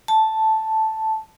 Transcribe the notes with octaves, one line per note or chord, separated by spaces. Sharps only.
A5